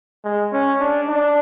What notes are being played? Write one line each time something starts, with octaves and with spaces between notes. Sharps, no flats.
G#3
C#4
D4
D4